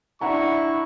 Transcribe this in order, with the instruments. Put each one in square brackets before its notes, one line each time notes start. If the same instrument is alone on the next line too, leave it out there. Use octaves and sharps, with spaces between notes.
[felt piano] D4 F#5 A#5 [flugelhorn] E4 [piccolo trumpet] C#6